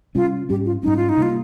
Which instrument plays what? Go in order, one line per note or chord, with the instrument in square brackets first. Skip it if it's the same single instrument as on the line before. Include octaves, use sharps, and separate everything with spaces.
[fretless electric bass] C3 G3 C#4 [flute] F4
[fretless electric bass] G#2 G3 C#4 [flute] G4
[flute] F4
[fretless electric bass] G#2 G3 C#4 [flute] D#4
[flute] F4
D#4
[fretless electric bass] C3 G3 A#3 [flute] F4